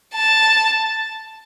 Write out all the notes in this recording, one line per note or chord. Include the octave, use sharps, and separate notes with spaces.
A5